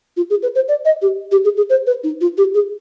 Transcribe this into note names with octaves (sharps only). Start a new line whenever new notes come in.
F4
G#4
B4
C5
D5
D#5
G4
G4
G#4
G#4
C5
B4
D#4
F4
G4
G#4